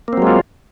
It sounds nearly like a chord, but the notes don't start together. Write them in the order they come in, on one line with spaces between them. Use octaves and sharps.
A#3 C4 F#3 G#3 F4